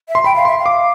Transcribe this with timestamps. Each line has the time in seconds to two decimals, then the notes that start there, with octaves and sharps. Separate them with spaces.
0.09 E5
0.15 C6
0.24 G5 B5
0.35 F5
0.45 E5 C6
0.59 F5
0.66 D6